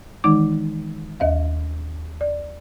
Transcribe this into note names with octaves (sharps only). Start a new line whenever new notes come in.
D#3 E3 G#3 D#4 D6
D#2 D#5 F5
D5